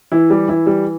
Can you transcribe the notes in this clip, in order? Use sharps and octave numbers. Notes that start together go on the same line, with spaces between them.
E3 E4
G3 G4
E3 E4
G3